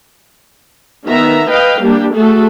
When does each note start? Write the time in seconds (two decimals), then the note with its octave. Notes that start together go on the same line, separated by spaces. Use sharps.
1.07 D#3 B3 E5 A#5
1.49 B4 D#5 F5 G5
1.82 G3 A#3 D4 G4
2.16 A3 F#4 G#4 A4